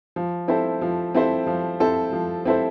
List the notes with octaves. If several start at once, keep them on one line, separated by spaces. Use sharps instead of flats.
F3
C4 E4 A4 C5
F3
C4 E4 A4 C5
F3
C4 E4 A4 C5
F3
C4 E4 A4 C5